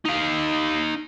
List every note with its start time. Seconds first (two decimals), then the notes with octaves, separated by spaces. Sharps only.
0.05 D#4 F5